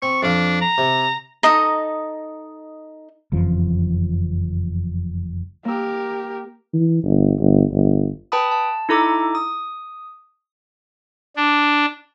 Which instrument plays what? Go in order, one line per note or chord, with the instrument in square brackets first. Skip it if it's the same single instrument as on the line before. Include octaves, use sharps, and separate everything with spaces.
[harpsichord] C4 [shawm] C#6
[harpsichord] F2 F5 [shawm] D4
[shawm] A#5
[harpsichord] C3
[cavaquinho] D#4 A4 D#5 A#5
[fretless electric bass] F#1 F2 E3 F3
[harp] A#3 E6 [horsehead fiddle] G4 A#4
[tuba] E3
G1
G1
G1
[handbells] B4 G5 A5 B5 D#6
A5
D#4 E4 A4 A#5 D6
D#6
[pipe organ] D4